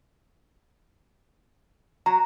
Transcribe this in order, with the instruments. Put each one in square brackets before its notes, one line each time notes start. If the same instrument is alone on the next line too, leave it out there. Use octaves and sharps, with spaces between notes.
[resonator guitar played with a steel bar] F#3 [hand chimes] A#5